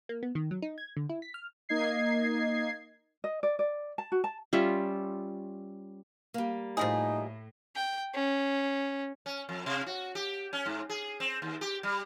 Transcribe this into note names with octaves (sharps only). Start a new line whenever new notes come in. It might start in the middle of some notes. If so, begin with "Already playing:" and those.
A#3
B3
D#3
F#3
D#4
G#6
D3
E4
B6
F6
A#3 D#4 D#5 G#6 C7
D#5
D5
D5
A5
F#4
A5
G3 C#4 F4 E5
G3 A#3
A2 F3 G#3 D#4 G#4
G5
C#4
C#4
F2
C3
F#4
G4
C#4
G#2
G#4
C4
D#2
G4
G3